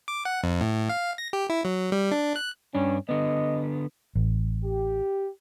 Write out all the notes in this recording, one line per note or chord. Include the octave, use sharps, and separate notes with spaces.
D6
F#5
F2
A2
F5
A#6
G4
E4
F#3
G3
D4
F#6
G2 C#4 D4
D3 B3 D#5
A1
G4